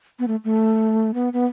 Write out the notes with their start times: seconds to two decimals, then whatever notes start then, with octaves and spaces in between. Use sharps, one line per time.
0.19 B3
0.27 A3
0.44 A3
1.14 B3
1.33 B3